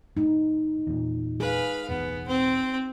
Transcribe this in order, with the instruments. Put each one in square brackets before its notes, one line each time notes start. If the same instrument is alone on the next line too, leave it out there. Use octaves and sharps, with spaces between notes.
[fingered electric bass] A2 [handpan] D#4
[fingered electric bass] E2 A#2
[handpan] G#4 [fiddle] B4 F5
[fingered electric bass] E1 A1 [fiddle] B3
[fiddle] C4